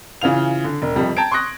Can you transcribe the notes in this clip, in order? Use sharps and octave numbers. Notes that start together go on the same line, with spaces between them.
C#3 E3 F4 F7
D3
E1
F2 C3 G3
G5 A5 A#5 G#6 D7
C6 C#6 D#6 F#6 A#6